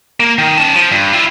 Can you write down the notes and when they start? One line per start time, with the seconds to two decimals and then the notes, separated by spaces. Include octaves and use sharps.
0.20 A#3
0.38 D#3
0.58 C#4 A5
0.75 F3
0.92 G2
1.12 E4 F4